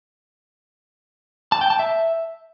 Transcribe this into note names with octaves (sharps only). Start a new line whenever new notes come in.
A5
G5
A5
E5